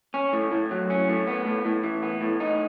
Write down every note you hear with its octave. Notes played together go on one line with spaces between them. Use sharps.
C#4
A2
A2
F#3
C#4
A2
B3
A2
A2
E3
B3
A2
D#4